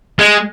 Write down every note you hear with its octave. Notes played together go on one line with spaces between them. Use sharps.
G#3